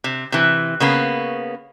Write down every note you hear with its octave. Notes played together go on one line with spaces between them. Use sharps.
C3
C3 E3
C#3 A#3 B3